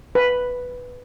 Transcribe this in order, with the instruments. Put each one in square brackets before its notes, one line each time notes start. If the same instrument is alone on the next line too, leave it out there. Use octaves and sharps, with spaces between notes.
[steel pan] B4